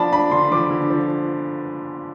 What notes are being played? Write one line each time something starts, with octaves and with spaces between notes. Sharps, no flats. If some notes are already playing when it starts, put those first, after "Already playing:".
Already playing: F3 D4 A5 B5
D4 B5
D3 C6
F3 D6
D3
F3